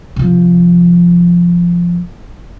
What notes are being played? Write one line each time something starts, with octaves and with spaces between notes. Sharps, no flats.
C3 F3